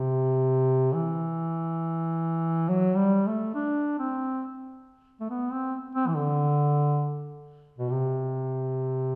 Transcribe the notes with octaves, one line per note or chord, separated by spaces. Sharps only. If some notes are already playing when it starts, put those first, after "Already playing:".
Already playing: C3
E3
F#3
G3
A3
D4
C4
A3
B3
C4
C4
E3
D3
B2
C3